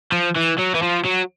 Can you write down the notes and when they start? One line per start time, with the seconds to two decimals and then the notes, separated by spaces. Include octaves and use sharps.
0.12 F3
0.36 E3
0.58 F#3
0.75 E3
0.82 F3
1.05 F#3